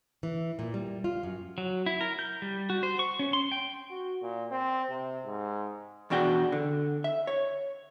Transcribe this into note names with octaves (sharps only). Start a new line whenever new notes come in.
E3
A#2
G3
F4
F#2
F#3
E4
A#4
G6
G3
F#4
C5
C#6
C#4
C6
G5
F#4
A#2
C4
C3
G#2
E2 B2 D4 F#4 G5
D3
E5
C#5